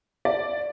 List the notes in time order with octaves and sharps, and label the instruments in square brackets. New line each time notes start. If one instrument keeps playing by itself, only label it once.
[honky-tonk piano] D5